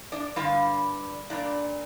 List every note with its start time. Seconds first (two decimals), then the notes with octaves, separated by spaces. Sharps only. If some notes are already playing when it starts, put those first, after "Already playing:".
0.12 D4 D5
0.36 G2 D3 G3 F4 F5
1.30 A#2 G3 D4 D5